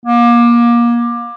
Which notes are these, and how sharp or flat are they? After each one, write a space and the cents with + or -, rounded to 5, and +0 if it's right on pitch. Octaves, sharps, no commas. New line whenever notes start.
A#3 +30